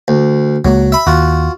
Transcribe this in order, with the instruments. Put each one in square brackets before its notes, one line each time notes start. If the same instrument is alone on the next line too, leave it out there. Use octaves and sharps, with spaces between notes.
[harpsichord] D2
[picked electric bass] C#2 G#3 A#3 [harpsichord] F#3
[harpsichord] E5 B5
[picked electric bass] D#2 [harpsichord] F4 F#4